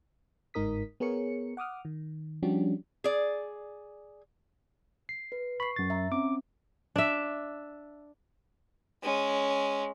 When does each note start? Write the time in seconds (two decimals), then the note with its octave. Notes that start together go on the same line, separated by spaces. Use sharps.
0.54 G1 G#2 D#4 A#4 D#6 B6
1.00 B3 G#4 A#4 C#5 C#7
1.57 F#5 D6 D#6 F6
1.85 D#3
2.43 F3 G3 C#4 D4 F#4 G4
3.04 G#4 D5
5.09 C7
5.32 B4
5.60 B5 C#6 C7
5.76 F#2 A6
5.90 E5 A#5
6.12 C4 C#4 D6
6.96 D4 E5
9.03 G#3 C#4